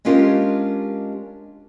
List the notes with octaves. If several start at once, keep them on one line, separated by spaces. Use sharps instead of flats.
G#3 C#4 D4 F4 G4 A#4